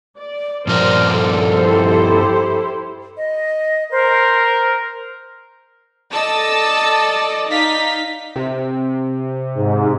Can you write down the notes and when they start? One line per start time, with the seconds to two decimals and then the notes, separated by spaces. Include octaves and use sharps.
0.19 D5
0.67 G2 F3 A#4 C5 D5 F6
1.14 A4
1.56 E4 G4 C5
3.17 D#5
3.91 A#4 C5
6.11 A4 D5 D#5 A5 E6
7.49 D#4 F5 B6
8.36 C3
9.55 G#2